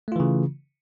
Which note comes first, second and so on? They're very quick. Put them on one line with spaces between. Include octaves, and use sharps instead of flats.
A3 F4 E3 C#3